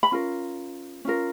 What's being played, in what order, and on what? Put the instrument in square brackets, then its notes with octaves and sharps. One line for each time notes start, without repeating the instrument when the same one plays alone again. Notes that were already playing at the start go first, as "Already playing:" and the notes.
[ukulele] B5
C#4 F4 A#4
C#4 F4 A#4